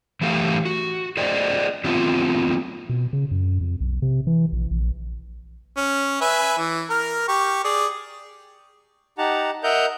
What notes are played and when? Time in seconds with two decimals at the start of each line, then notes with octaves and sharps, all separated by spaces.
0.21 E3 F#3 A3 G4 A4 F5
0.65 F#4
1.17 G#4 C5 D5 D#5 G5
1.84 F#3 A3 B3 C4 F4
2.89 B2
3.13 C#3
3.31 F#2
3.61 F2
3.81 B1
4.02 C3
4.27 E3
4.52 A#1
4.71 A#1
5.77 C#4
6.21 B4 E5 G#5
6.57 E3
6.90 A#4 F6
7.28 G4 C#6
7.64 G#4 D5
9.18 D#4 G4 F#5 A5 A#5
9.63 A#4 D#5 E5 F#5 A#5 G6